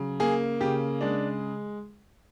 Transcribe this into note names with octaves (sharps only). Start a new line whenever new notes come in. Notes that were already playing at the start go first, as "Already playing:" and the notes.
Already playing: C#3 F#3
A#3 G#4
C#3 G4
G#3 D4